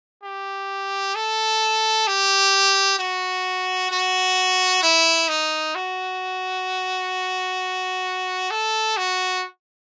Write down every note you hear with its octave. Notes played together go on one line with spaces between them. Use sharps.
G4
A4
G4
F#4
F#4
E4
D#4
F#4
A4
F#4